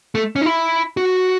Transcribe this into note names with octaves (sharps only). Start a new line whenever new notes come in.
A3
C#4
D#4
E4
F#4